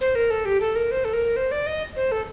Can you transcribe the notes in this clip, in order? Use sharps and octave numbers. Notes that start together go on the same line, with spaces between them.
C5
A#4
A4
G4
A4
A#4
C5
A4
A#4
C5
D5
D#5
C5
A4